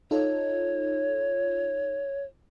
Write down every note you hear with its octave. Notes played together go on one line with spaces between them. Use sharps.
D#4 F4 A4 C#5